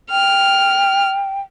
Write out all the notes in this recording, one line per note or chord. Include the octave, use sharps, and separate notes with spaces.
G5 F6